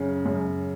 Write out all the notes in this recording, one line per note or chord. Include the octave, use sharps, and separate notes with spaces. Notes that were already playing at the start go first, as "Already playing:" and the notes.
Already playing: F#2 C#3
F#2